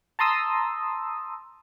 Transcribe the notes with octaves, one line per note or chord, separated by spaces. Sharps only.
A5 A#5 C6 D#6 E6